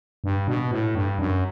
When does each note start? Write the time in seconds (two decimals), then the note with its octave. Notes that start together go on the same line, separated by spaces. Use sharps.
0.24 G2
0.48 B2
0.71 A2
0.95 G2
1.19 F#2